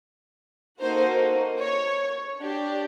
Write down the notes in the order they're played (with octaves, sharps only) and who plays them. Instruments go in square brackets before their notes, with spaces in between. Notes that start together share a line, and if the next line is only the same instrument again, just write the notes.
[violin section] A#3 D#4 F#4 A4 C5
C#5
D4 G4